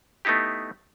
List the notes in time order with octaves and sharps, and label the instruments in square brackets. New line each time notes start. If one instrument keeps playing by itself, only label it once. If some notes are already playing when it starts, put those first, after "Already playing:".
[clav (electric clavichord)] A3 B3 D#4 E4 G4